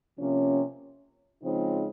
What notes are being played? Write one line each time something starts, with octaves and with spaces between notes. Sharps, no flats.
C3 F3 A#3 C#4
C#3 F3 G#3 C4 D#4